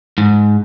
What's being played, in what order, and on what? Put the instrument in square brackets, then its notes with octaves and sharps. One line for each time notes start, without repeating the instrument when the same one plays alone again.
[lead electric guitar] G#2